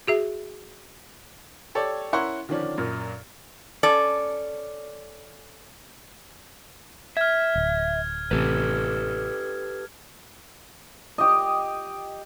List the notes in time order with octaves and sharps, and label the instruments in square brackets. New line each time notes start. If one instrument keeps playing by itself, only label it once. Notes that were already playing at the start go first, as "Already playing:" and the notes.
[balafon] F#4 G#4 E5
[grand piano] G4 A4 C#5 D5
C#4 E4 A#4 F#5 C6 C#6
D3 D#3 F3 C#4 D4
F#2 A#2
[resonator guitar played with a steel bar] C#4 A4 D5
[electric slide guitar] E5 [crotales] F6 G#6
[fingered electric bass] D1
[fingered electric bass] A1 C3 [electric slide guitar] G4 A4 B4
[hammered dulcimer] G4 D#5